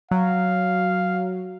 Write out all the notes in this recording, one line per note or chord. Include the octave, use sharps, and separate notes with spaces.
F#3 F5